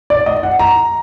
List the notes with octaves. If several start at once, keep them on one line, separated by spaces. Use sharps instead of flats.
D5
D#5
F#5
A#5